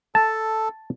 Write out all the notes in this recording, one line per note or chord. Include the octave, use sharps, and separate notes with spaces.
A4 A5